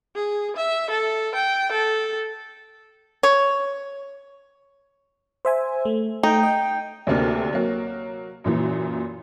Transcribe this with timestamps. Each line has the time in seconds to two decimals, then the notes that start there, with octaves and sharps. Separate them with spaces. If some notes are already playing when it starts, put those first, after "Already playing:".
0.16 G#4
0.56 E5
0.90 A4
1.35 G5
1.71 A4
3.23 C#5
5.45 C5 E5 G#5
5.85 A3
6.23 A3 D#4 G5
6.43 D#5
7.07 D2 C3 A#3 D4 F6
7.53 F#3 A#3
8.44 F#2 A#2 E3